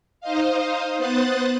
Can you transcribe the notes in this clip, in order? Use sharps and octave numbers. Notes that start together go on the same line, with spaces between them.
D#4 C5 D#5 F5
B3 C5 D#6 F#6 A6